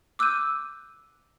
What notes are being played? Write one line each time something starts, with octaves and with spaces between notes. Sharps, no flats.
D6 E6 F#6 G6 D#7